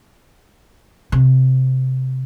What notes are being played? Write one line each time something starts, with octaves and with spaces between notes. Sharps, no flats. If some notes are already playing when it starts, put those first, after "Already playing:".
C3